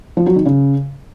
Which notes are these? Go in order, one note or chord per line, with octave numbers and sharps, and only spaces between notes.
F3
F#3
D#3
C#3